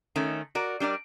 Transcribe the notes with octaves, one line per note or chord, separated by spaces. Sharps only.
D#3 A3 C#4
F#4 A#4 D5
G3 D4 A#4 D5